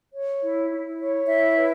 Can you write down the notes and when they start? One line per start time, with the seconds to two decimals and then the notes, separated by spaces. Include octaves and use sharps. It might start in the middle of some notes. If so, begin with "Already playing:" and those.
0.14 C#5
0.42 E4
0.70 E4
0.99 C#5
1.26 E4 E5
1.55 B4